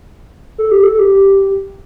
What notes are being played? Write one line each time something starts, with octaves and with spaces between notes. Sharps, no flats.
A4
G4
A4
A4
G4